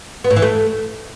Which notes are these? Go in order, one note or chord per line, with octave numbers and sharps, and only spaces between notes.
B3
A2
E3
A3